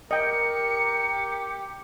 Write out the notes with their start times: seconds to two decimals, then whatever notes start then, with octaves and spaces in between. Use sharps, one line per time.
0.11 G4 A#4 D#5 G5 C#7